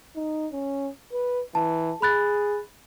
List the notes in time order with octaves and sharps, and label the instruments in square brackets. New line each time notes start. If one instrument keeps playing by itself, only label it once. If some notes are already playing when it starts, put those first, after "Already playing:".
[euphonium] D#4
C#4
B4
[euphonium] E3 [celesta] A5
[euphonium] G#4 [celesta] B5 F#6 A6